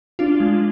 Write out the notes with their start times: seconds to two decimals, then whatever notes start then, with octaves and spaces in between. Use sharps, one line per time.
0.19 D4 F4
0.40 G#3